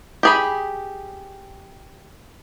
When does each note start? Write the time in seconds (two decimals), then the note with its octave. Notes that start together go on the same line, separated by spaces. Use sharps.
0.23 G4 G#4 B5